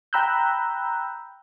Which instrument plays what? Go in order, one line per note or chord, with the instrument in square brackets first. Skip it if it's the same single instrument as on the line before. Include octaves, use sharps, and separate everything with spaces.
[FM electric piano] G5 A#5 B5 E6 F#6 G6